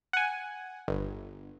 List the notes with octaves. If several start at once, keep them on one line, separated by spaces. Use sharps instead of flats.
F#5 G#5
G1